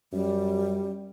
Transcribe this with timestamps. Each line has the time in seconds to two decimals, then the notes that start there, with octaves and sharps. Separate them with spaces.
0.13 F#2 G3